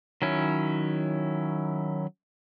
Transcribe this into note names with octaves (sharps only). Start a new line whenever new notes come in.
D#3 F#3 C#4 E4